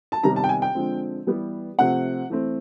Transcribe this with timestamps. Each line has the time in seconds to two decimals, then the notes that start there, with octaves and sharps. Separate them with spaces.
0.12 A5
0.23 C3 D#3 G3 B3 A#5
0.36 A5
0.44 G5
0.49 G#5
0.62 G5
0.75 D3 F3 G#3 C4
1.27 E3 G3 B3
1.78 C3 F3 A3 C4 F#5
2.30 E3 A3 C4